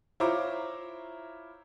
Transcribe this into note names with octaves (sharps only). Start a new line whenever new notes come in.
E4 F4 C5 C#5 A#5 D6